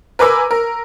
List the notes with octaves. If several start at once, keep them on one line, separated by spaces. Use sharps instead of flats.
A#4 B4 G#5 D6 E6
A#4